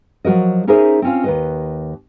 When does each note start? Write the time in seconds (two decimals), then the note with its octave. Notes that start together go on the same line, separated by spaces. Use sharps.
0.25 F3 F#3 F#4 A#4 D#5
0.67 C#4 D#4 G#4 A#4 C5 E5
1.02 C4 C#4 F4
1.24 D#2 B4 D#5